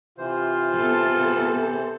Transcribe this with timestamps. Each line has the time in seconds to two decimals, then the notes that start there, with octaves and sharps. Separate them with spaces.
0.18 C3 E3 F4 C5
0.75 B3 A4